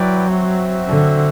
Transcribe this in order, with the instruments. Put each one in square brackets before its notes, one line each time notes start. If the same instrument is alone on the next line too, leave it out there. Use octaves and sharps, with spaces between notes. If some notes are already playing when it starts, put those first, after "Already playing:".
Already playing: [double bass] F#3 [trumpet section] E4 B4 D5 G5
[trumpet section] C4 F#4 C5 E5
[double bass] D3